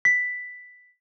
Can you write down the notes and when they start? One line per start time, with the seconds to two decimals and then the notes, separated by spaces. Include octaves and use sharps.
0.05 B6